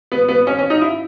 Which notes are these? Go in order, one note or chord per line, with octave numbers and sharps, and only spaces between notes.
B3
B3
C#4
C#4
D#4
E4